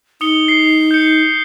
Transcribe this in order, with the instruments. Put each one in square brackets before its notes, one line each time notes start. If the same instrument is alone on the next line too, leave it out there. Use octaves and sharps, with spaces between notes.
[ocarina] D#4 [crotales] D#6 C#7 G7
[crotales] C7
G6 C#7